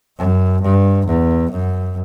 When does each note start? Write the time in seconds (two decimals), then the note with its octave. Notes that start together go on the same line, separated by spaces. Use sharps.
0.18 F#2
0.62 G2
1.06 E2
1.51 F#2